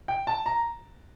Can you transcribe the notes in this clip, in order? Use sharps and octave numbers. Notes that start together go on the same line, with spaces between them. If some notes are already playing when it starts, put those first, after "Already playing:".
G5
A5
A#5